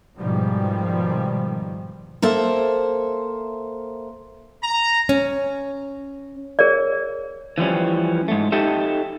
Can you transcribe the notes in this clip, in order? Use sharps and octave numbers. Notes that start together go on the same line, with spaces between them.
G#2 B2 D#3 F3 G3
A#3 A4 C5 E5
A#5
C#4
G#4 A#4 C#5 D5
E3 F3 G3 C#4
G#2 A3
D#4 G4 A4 E5